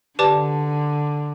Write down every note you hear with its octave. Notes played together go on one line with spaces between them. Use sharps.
D3 G4 B4 D5 A5 D6